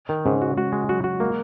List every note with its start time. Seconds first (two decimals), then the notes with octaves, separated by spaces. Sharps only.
0.09 D#3
0.25 G#2 C#3 C#4
0.42 F#4
0.57 G#3 F#4
0.72 G#3
0.89 F#3 F#4
1.04 F#4
1.20 G#3 A#3